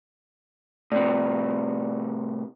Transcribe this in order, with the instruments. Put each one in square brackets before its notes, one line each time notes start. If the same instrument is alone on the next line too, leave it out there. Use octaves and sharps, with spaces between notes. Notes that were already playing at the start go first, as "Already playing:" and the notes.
[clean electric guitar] A2 C3 [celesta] D5